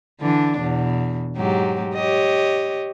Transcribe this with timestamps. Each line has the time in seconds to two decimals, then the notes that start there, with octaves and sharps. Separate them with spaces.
0.21 D3 E3 D4
0.60 E2 B2
1.37 G#2 F#3 G4
1.94 G4 C#5 D#5